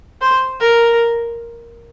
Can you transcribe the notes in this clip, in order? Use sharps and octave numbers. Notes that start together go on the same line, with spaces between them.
C5
A#4